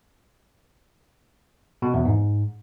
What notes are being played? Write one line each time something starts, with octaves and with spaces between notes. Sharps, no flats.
B2
E2
G#2